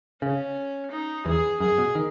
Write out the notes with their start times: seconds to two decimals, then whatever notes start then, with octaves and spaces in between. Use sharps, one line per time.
0.22 C#3 C#4
0.91 D#4
1.26 E2 G#4
1.60 F#2 G#4
1.78 B2
1.95 D#3